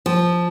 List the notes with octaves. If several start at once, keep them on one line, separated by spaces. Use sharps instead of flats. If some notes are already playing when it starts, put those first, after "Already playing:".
F3